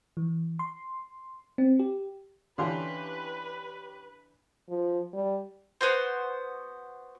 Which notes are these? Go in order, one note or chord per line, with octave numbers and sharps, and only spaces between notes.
E3
C6
C4
G4
D3 E3 C#4 G4 B4 F5 C6
F3
G3
B3 F#4 C5